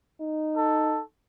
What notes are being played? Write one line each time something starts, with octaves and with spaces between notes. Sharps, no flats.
D#4
A4